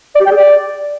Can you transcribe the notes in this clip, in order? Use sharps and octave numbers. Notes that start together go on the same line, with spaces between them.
D5
G4
G5
G#4
D5